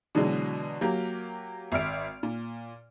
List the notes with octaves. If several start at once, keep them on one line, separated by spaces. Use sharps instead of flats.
B2 D3 E3 F#3 G#3
F#3 A#3 G4 A#4
G#1 E5 F6 D7
A#2